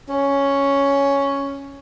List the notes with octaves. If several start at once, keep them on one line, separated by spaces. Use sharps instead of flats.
C#4